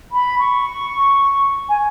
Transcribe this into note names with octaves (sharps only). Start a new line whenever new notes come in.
B5
C#6
G#5